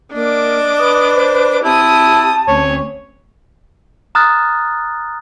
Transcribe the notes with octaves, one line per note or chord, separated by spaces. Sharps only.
A#3 D4 D#5 D6
B4 D#6
C5
C4 E4 G4 A5 D#6
D2 C4 C#4 C#5
A#5 D#6 F6 F#6 A6